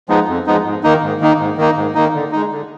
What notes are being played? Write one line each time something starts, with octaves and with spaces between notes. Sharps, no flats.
F3 G#3 B3 D#4
F2
F3 G#3 B3 D#4
G#2
D#3 A#3 D#4
G#2
D#3 A#3 D#4
G#2
D#3 A#3 D#4
G#2
D#3 A#3 D#4
D3
G#3 D#4
D3